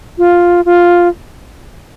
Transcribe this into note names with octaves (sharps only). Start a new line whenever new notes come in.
F4
F4